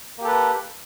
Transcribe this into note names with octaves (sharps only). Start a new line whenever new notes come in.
A#3 G4 A4 B4